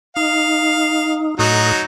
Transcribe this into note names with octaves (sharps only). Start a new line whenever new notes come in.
D#4 F5
A2 F#3 D#4 F#4 D#6